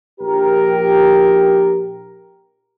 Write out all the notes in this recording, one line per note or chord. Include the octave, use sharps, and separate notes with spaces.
A#1 G4 A#4